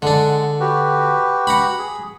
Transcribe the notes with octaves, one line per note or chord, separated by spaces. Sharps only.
D3 G#3 D4 F#5
F#4 G4 B4
F#5 A#5 B5
G#4